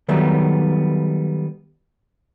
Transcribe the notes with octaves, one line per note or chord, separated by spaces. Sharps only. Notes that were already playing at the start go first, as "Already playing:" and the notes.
D#3 F#3 G3 A3 B3